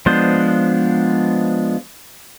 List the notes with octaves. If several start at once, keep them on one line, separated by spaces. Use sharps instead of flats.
F3 G#3 B3 D4 C5